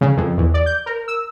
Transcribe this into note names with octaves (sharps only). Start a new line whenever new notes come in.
C#3
F2
E2
D5
G6
A#4
E6